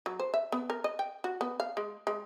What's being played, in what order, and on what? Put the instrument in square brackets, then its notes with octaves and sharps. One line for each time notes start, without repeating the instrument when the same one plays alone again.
[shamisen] F#3
C5
E5
B3
A#4
D#5
G5
F#4
B3
F5
G#3
G#3